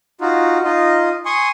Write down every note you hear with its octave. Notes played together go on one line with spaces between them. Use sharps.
D#4 F4 F#4
D#4 F4 D#5
G#5 C6 C#6 D#6